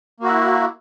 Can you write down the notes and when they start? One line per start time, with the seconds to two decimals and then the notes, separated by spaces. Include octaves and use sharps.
0.20 A#3
0.23 F#4
0.26 E4